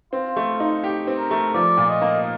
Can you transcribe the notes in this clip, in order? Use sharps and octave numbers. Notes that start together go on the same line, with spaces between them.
C4 F4
A3
D#4
G4
C4
A#4
A3
F3 D5
A#2
D#5
A#3